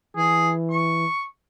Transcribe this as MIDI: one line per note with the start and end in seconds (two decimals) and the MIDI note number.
0.17 1.06 52
0.17 0.50 68
0.70 1.23 85